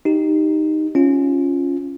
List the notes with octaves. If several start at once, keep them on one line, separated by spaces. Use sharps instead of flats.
D#4 G4
C#4 F4